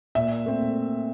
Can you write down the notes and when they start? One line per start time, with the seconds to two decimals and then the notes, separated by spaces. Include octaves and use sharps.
0.15 A#2 E5
0.46 A3 C4